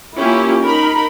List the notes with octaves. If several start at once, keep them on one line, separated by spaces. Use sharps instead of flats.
A#3 C#4 E4 F4 G4
D#4 A#4 B5